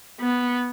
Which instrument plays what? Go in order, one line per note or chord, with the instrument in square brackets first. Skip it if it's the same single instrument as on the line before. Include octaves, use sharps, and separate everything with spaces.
[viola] B3